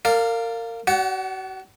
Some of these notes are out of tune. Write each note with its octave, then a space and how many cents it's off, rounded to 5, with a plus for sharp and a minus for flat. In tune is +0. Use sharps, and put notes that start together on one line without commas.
A#4 -30 D5 +0 F5 +0
F#4 +40 D5 -30 F#5 +5